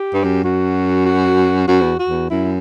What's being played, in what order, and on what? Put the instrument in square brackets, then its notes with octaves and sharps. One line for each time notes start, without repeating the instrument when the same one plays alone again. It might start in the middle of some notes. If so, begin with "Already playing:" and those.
Already playing: [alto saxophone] G4
[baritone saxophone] G2
F#2
[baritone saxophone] F#2 [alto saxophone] F#4
[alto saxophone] F#4
[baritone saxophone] F#2 [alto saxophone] F#4
[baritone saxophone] E2
[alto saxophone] F#4
[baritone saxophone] E2
[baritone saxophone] F#2 [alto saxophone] E4